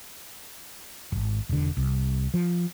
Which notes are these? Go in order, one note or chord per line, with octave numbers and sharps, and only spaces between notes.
D1 G#1
E1 D3
C2
F3